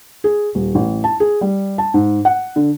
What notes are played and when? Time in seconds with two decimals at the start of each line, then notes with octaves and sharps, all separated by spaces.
0.24 G#4
0.55 D#1
0.75 A1
1.04 A5
1.20 G#4
1.41 G3
1.78 A5
1.94 G#2
2.25 F#5
2.56 D3